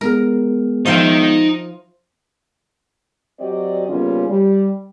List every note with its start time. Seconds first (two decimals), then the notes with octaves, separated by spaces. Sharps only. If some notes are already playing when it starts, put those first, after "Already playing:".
0.01 G#3 B3 G#4 A#4
0.86 F3 D#4 E5 F5 G5
3.40 F#3 C4 F#4 G4 D5 D#5
3.89 C#3 G3 A#3 B3 C#4 F4
4.29 G3